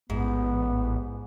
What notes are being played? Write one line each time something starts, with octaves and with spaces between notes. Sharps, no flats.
A1 G#2 B3